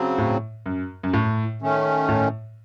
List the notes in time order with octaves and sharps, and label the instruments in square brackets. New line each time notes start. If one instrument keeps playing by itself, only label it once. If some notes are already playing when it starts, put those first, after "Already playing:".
Already playing: [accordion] C#3 F#3 C4
[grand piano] A2
F#2
F#2
A2
[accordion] D#3 A3 C#4
[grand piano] A2